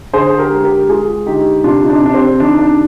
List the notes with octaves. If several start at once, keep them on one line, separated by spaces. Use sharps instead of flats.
D3 G#4 C5
G4 A#4
G#3
G4 A#4
G#3 F4 G#4
D3 D#4 G4
C3 D4 F4
D#4
D4
C3 D4
C4
D#3 D4
D4